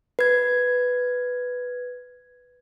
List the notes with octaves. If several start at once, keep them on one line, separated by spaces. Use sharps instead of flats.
B4 G#6